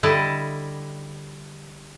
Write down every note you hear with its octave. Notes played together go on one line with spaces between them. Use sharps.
D3 G3 E4 D5 D#5 A5